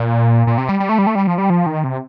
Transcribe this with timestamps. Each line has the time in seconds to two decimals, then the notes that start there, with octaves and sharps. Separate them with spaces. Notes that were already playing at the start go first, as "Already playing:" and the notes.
Already playing: A#2
0.47 A#2
0.58 C3
0.69 G3
0.80 G3
0.89 A3
0.99 G3
1.07 A3
1.15 G3
1.27 F3
1.38 G3
1.50 F3
1.66 D#3
1.84 C3